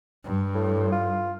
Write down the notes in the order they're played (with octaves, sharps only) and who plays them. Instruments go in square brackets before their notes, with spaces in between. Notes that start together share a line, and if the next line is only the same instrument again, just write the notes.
[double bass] G2
[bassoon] A2
F4